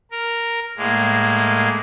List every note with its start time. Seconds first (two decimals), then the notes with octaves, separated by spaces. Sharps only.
0.11 A#4
0.77 A2 G#3 A#3